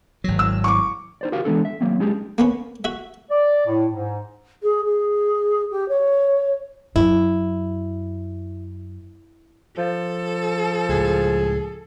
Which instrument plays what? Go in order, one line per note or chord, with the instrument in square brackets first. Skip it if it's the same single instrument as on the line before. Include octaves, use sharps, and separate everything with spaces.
[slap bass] G#1 F#3
[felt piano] E6
C#6 D6
[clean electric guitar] D#4 C5 D5
F#4 G4 A#4 F5
E3 G#3 B3 D4 A4
E5
F#3 A#3 C4
G#3 C#4 D#4 G4 G#4
[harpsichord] A#3 B3 C#4
F#4 E5
[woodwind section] D5
A2
G#2
[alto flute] G#4
G#4
G4
C#5
[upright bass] F#2 [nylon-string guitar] E4
[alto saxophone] F3 [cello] A4
[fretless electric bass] C#2 A2 [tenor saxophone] G#4